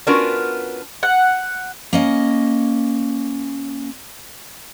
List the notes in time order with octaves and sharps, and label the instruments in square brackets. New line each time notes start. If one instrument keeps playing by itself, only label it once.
[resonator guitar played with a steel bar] B3 C#4 D4 F4 F#4 A#4
[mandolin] F#5
[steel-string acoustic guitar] A#3 C#4 D#5